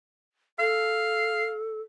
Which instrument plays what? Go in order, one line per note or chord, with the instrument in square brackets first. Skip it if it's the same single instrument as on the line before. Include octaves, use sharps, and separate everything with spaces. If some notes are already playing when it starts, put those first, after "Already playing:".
[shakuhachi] A4 [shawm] F5